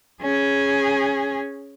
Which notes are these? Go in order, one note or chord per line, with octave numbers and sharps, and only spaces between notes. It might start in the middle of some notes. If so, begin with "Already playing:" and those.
C#4 G#4